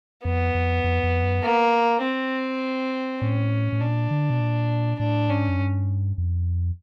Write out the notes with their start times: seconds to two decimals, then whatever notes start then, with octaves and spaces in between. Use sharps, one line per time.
0.25 F2 B3
0.54 F2
0.84 F2
1.03 F2
1.23 F#2
1.43 A#3
2.02 C4
3.21 A2 C#4
3.72 A2
3.81 A#2 D4
4.10 D3
4.30 B2
4.40 A#2
4.99 A2 D4
5.29 G#2 C#4
5.49 F#2
5.59 G2
6.18 F2